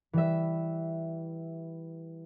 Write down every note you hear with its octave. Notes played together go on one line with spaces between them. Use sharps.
E3 G3 E5